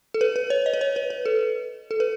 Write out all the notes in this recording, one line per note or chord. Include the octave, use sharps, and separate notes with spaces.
A4
B4
B4
C#5
D#5
B4
C#5
B4
B4
A4
A4
B4